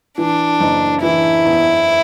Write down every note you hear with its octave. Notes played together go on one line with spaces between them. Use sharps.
E3 D4
F#1
E3 E4
E2